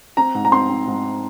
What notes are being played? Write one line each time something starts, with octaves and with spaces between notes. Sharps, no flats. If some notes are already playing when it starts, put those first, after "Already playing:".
C4 A#5
G#2
A#5
C4 C6
C4
G#2